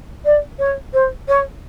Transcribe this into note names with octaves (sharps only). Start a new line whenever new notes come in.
D5
C#5
C5
C#5